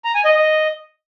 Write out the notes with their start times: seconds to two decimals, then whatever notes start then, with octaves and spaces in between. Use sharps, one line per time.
0.05 A#5
0.15 G#5
0.25 D#5
0.35 D#5